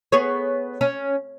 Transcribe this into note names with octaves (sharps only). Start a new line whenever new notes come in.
B3 G#4 C#5
C#4